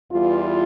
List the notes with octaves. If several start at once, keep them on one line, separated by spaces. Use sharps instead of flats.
E2 E3 G3 F4